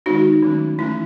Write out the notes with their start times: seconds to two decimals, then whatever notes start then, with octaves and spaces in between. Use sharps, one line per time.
0.06 D#3 G#3 B3 D#4 F#4
0.42 D#3 F#3 A3 C#4
0.79 E3 A3 C#4 E4